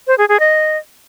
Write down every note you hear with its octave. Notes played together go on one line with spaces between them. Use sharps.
C5
G#4
G#4
D#5